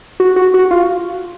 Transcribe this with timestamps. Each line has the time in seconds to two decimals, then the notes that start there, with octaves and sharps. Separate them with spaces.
0.20 F#4
0.36 F#4
0.54 F#4
0.71 F4